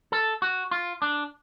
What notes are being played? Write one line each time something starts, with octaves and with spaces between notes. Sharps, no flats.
A4
F#4
F4
D4